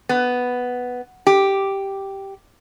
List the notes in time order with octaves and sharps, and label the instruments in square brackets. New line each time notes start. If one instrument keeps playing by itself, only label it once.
[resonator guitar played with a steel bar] B3
G4